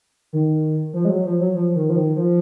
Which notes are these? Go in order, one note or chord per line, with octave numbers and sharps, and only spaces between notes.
D#3
F3
G#3
F#3
F3
F#3
F3
D#3
F3
D#3
F3